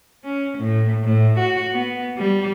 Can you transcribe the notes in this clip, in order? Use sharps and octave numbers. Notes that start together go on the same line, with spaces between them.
C#4
A2
A2
F#4
B3
G3